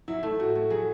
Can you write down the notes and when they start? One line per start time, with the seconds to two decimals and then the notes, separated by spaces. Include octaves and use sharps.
0.08 F#3 E4
0.23 A3
0.40 A2 F#4
0.55 A2
0.70 F#3 G#4